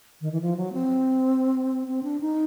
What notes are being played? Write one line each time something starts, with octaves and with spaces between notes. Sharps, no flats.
D#3
E3
F3
F#3
C4
C4
D4
D#4